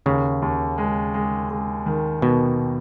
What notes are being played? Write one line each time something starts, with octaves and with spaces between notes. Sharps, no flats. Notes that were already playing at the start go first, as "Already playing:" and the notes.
D#2 C#3
D#2
G#3
G#3
G#3
D#3
B2 D#3